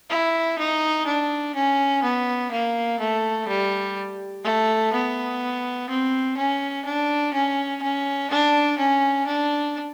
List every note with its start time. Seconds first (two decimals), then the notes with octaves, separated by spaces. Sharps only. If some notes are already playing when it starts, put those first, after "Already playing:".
0.10 E4
0.59 D#4
1.07 D4
1.55 C#4
2.03 B3
2.52 A#3
3.00 A3
3.48 G3
4.44 A3
4.93 B3
5.89 C4
6.37 C#4
6.85 D4
7.34 C#4
7.82 C#4
8.31 D4
8.78 C#4
9.27 D4